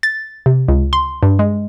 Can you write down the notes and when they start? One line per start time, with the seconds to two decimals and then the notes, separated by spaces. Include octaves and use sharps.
0.03 A6
0.46 C3
0.68 C#2
0.93 C6
1.23 G2
1.39 G#3